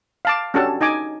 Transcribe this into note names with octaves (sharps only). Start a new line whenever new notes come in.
F5 A5 D6
C#4 D4 F#4 G4 A4 A5
D#4 D#5 G#5 D6